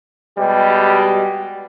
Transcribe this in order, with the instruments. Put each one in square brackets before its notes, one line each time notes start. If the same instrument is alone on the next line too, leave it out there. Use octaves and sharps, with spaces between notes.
[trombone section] B2 G3 G#3 G4